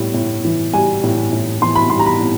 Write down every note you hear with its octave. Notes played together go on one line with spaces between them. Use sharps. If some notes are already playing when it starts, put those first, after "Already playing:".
Already playing: A2 G3
A2
E3
G3 G#5
A2
A2
E3 C6
B5
G3 C6
A#5
B5
A2